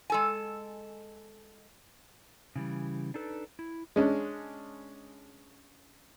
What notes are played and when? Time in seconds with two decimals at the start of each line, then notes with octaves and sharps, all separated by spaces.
0.10 G#3 A4 G#5
2.56 C#3 E3 G3
3.14 D4 D#4 A4 B4
3.59 E4
3.96 G#3 C#4 D4